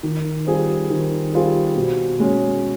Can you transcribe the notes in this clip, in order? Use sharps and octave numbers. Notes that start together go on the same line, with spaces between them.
D#3
G3 C4 F4 G#4
D#3
G3 C4 F4 G#4
B2
G#3 C#4